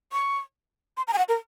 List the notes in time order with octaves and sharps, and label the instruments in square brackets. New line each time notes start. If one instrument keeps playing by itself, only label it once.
[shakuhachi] C#6
C6
A#5
G#5
F#5
A#4